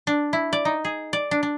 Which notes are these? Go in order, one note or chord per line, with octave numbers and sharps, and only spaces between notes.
D4
E4
D5
D#4
G#4
D5
D4
D4